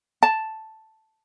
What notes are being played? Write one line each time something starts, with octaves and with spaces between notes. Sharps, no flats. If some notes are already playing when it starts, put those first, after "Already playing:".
A5